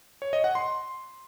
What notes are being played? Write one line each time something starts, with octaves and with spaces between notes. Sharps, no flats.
C#5
D#5
F#5
C6